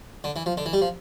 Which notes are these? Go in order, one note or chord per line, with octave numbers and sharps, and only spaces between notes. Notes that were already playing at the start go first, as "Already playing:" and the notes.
D3
E3
F3
D3
E3
G3
F3